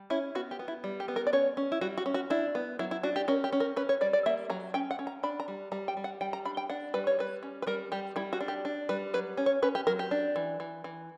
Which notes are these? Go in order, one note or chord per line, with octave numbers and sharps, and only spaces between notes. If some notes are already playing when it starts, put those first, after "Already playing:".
Already playing: G3
C#4 E4
B3 F#4
G4
B3
E4
G3
G4
B3
A#4
D5
C#4 C#5
C#4
E4
G3 F#4
F#4
C#4
F#4
D4 E4
B3
F#3 E4
E4
D4 F#4
G4
C#4 A#4
G4
C#4
A#4
C#4 B4
C#5
G3 D5
D5
A#3 E5
F#3 A#5
C#4 G5
F#5
C#4
A#5
D4 B5
A#5
G3
G3 A#5
G5
G3
F#5
G3 G5
A#5
D4 B5
G5
D4 F#5
G3 B4
C#5
G3 B4
C#4
B4
G3 A#4
G3 G4
G3 E4
F#4
D4
G4
D4
G3 B4
F#3 B4
C#4
C#5
C#4 B4
G4
F#3 A#4
G4
D4
E3
E3
E3